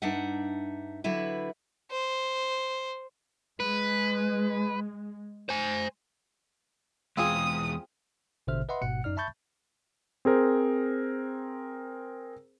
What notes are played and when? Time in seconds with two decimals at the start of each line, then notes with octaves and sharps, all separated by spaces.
0.02 G2 D4 D#4 E5 F#5
1.04 D3 F#3 E4 B4
1.91 C5
3.60 G#3 B4
5.49 C5 G#5
7.17 E2 G#3 C4 F4 G#4 D#6
8.47 A1 B2 D3 C5 E5 F6
8.69 B4 D#5 E5 F#5 B5 C6
8.82 G#1 G#2 B2 F#5 C#7
9.04 F#2 D#4 D5 F6
9.17 E5 A5 B5 C#6 G6 A6
10.25 C4 G#4 A#4 C5